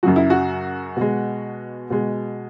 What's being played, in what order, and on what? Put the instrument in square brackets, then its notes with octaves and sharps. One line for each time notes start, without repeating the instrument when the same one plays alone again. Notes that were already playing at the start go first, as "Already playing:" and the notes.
[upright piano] F#2 C#3 F#3 F#4
E4
F#4
B2 G#3
B2 G#3